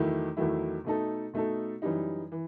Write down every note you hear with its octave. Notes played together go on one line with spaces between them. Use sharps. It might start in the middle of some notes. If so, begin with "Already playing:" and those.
Already playing: E2 D#3 F#3 A3 E4
E2 D#3 F#3 A3 E4
B2 A3 D#4 A4
B2 A3 D#4 A4
F#2 E3 G3 D#4
E3